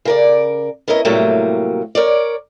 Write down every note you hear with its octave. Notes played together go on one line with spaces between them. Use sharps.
C#3 A#4 D5
B3 C#4 E4 A#4 D#5
A2 C3 F#3 G3 A3 A#3
A#4 C#5 D5